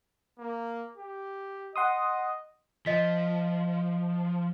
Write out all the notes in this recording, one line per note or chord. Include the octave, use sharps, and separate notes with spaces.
A#3
G4
D#5 F#5 C6 D#6
F3 D#5 B6